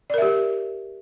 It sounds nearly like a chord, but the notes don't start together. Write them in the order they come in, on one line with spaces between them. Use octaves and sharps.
D5 A#4 E5 G4